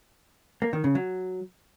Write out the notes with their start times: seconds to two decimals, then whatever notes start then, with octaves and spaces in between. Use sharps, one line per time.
0.62 A#3
0.73 D#3
0.84 C#3
0.95 F#3